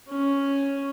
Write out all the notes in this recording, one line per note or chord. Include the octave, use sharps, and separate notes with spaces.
C#4